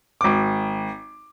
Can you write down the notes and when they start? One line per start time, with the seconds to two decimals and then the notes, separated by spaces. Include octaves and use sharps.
0.21 G#1 D6